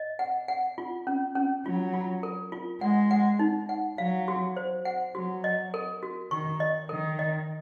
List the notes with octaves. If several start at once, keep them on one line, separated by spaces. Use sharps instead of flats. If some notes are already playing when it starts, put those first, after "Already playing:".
Already playing: D#5
F#5
F#5
F4
C#4
C#4
F#3 F4
F4
A#4
F4
G#3 F#5
F#5
D#4
F#5
F#3 F5
F#4
C5
F#5
F#3 F#4
D#5
A#4
F#4
D#3 C#6
D#5
D#3 A#4
D#5